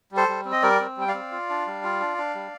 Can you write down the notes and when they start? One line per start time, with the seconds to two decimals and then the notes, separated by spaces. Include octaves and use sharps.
0.11 G3
0.17 A4 C5
0.28 G3
0.45 C4
0.52 D#5
0.62 G3 A#4 D5
0.80 C4
0.97 G3 G5
1.08 D5 F5
1.14 C4
1.31 F4
1.49 D4
1.67 G3
1.84 F4
2.00 D4
2.18 D4
2.35 G3